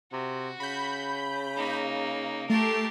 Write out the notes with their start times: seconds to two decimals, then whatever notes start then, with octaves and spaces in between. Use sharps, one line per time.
0.12 C3 F#4
0.60 C#3 B5 G6
1.57 A#3 D#4
2.50 A3 G4 A#4 A5 C7